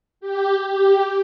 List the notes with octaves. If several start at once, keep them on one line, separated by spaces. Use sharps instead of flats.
G4
G4